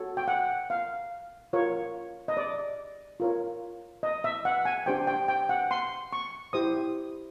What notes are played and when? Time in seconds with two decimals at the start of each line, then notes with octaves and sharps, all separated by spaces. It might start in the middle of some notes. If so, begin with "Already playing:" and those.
Already playing: F#4 A4 C#5
0.17 G5
0.28 F#5
0.70 F5
1.53 F4 A#4 C#5
2.28 D#5
2.37 D5
3.20 F4 A#4 C#5
4.03 D#5
4.24 E5
4.45 F#5
4.65 G#5
4.86 D4 G4 C5 G5
5.07 G5
5.28 G5
5.49 F#5
5.71 C6
6.13 C#6
6.53 E4 G4 C5 D#6